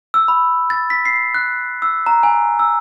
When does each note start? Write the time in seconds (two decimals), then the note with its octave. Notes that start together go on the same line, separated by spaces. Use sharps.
0.14 E6
0.28 B5
0.70 A6
0.90 B6
1.05 C7
1.34 F#6
1.82 E6
2.07 A#5
2.23 G#5
2.59 E6